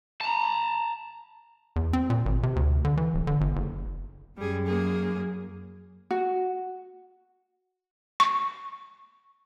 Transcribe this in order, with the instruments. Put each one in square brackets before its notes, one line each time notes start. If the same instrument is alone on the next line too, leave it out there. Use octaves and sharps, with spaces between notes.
[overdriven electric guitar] A5 A#5
[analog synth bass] E2
C4
A#2
G#1
C3
D2
D3
E3
D1
D3
G1
F#1
[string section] F#2 [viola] G3 G#4
[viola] A#3 G#4
[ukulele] F#4
[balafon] C#6